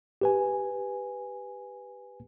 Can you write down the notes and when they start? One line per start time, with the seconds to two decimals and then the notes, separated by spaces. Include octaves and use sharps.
0.21 G4 B4 G#5